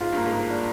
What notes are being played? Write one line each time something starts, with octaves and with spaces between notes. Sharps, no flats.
G#2 F4
G2 A#3
G#2
A#3
D4